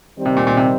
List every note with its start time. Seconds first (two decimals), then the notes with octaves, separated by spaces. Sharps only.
0.16 D#3 G3 C4
0.26 C3
0.37 A#2
0.47 A#2
0.57 C3